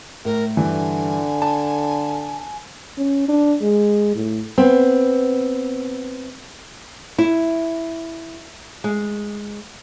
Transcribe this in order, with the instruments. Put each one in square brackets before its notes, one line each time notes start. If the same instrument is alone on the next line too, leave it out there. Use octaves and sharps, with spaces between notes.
[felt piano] A2 [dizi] A#4
[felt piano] G2 E3 [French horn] D3 [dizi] G#5
[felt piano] A5
[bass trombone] C#4
D4
G#3
A2
[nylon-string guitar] B3 C4
E4
G#3